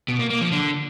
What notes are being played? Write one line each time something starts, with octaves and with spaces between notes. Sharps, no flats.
B2
A#3
A#3
F3
D3